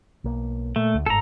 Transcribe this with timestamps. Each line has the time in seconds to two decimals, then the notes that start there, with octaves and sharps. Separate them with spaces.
0.24 B1 A#3
0.76 A#2 A3
0.94 D2
1.06 G1 G#2 A4 A#5